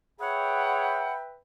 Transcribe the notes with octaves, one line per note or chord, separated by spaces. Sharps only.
G#4 B4 C#5 E5 F#5 G5 B5